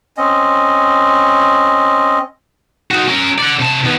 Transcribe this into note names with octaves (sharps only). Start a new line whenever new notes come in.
C4 C#4 D#5
D#4 F#4
C#4 A#4
D5 F#5
C3 A5
D#3 B3